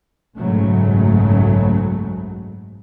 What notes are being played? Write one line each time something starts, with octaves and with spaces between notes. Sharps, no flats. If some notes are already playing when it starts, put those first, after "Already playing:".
F#1 B1 G#2 C#3 F#3 A3